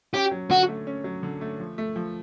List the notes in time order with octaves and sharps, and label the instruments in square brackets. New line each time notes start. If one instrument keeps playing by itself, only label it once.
[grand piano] C#4 [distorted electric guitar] G4
[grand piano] F#3
[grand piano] D3 [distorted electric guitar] F#4
[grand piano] A3
C#4
F#3
D3
A3
F3
A3
F3